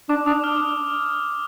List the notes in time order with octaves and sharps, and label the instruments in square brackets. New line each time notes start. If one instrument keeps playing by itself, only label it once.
[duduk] D4 [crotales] D6
[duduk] D4 [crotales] D#6
[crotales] F6